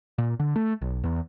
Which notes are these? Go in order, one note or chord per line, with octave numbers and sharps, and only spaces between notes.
A#2
D3
A3
B1
E2